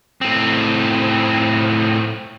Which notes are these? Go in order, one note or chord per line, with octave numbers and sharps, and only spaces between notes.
A2 C4